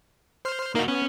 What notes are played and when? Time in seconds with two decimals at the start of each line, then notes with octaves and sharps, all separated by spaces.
0.45 C5 C6 F6
0.75 A#3 D#4 F#4 A#4 F5
0.88 B3 C#4